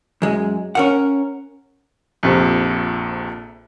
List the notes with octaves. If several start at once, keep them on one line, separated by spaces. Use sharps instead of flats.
F#2 G#3
C#4 A#4 F#5
A#1 F2 C3